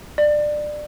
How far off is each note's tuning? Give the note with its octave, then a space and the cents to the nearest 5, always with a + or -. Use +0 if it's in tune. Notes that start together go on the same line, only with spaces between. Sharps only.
D5 +20